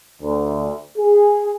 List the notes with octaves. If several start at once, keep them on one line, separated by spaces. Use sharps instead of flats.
D2
G#4